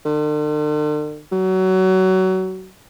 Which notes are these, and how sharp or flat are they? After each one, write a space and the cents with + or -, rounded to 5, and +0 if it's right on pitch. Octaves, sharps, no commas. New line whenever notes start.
D3 +45
F#3 +25